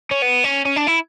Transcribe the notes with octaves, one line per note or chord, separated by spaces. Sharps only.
C#4
B3
C#4
C#4
D4
E4